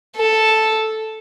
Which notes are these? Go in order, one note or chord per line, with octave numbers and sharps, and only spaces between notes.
A4